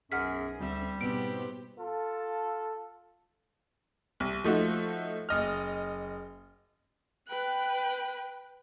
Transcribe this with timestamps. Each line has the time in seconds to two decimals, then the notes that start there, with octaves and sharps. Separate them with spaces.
0.12 B1 F#2 G#4 F#5 F6 B6
0.60 D2 G3 C4 E5
1.01 G#2 B2 B3 C4 G4 D7
1.77 F4 A4
4.20 C2
4.44 F3 A3 D#4 F#4
5.29 F#1 D#5 F6
7.27 B4 G5 F#6